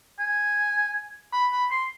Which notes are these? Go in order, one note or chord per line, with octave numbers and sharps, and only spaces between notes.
G#5
B5
B5
C6